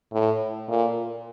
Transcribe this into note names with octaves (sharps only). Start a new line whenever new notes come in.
A2
A#2